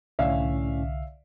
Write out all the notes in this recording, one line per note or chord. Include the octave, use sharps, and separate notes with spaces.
C2 A2 D3 C#4 D5 E5 F5